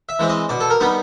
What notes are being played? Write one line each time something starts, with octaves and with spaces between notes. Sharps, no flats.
E5
E3 G#3 C4
D#5
B2 D5
A4
A#4
G3 B3 D#4